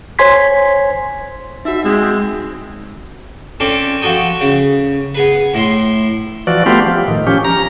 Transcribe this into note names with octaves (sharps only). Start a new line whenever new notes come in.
C5 C#5 G#5 C6 G#6 B6
D#4 F#4 E5
G#3 C4
C4 C#4 F4 A4 D5
F3 F#4 A4 G5 D#6
C#3
B3 G#4 B4
A2 E4 C6
E3 F3 F#4 D5
A3 B3 C4 F4 G4
F3
A2 D#3
F3 C#4 G4
A#5